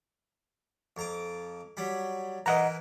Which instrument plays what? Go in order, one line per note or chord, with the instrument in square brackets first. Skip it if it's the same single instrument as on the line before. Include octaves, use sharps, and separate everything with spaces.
[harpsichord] F2 A#5 D6
F#3 G3 B5
[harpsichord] E3 A#4 B4 [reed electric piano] D#5 F#5 A#5